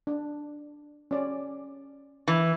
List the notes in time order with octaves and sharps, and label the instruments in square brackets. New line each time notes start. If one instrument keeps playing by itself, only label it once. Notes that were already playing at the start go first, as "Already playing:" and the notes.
[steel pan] D4
C#4 D5
[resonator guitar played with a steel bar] E3